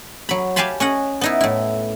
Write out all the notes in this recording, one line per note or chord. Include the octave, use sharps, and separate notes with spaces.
F#3 B5
G4 F5 G#5 A5 B5 C6
C#4 D#5 F#5
B3 D#4 E4
A2 E4